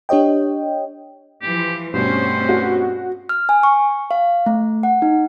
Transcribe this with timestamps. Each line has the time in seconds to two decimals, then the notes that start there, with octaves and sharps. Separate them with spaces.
0.09 D4 G4 C#5 D#5 G5
1.42 E3 F3 G4
1.94 G2 B2 A3 C4 C#4 C5
2.49 F#4
3.29 F6
3.49 G#5
3.63 C#6
4.11 F5
4.46 A3
4.83 F#5
5.02 D#4